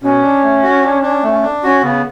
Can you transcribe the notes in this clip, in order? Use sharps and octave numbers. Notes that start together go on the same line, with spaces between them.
B2 C#4
D4
A3
F#4
D4
D4
A3
D4
C#4 F#4
C#3 B3